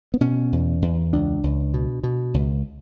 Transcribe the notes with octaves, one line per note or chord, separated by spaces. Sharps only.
B3
B2 C#4
E2
E2
C#2 D4
C#2
B2
B2
C#2